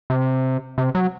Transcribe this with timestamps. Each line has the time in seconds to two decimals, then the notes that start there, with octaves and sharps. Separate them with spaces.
0.10 C3
0.78 C3
0.95 F#3